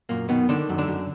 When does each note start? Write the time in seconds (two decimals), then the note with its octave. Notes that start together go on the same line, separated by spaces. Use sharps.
0.09 F#2 A#2 A#3
0.29 B2 D#3 B3
0.49 D3 D#3 D4
0.69 F#2
0.78 D3 D4
0.88 F#2